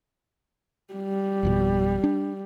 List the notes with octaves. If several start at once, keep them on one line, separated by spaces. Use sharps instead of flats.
G3
G#1 F2 B2
D4